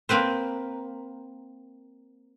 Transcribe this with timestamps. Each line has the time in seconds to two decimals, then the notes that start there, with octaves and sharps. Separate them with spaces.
0.09 A#3 C4 B4 C5